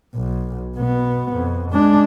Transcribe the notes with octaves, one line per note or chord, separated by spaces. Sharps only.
B1
B2 B3
F2
G#3 D4